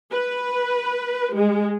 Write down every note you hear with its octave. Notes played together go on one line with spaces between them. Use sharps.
B4
G#3